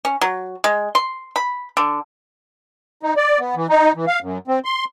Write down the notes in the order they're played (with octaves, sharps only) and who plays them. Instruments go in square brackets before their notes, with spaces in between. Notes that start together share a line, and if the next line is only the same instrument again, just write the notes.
[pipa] C#4
F#3
G#3
C6
B5
D3
[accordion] D#4
D5
B3
E3
D#4
E3
F5
F#2
C4
C6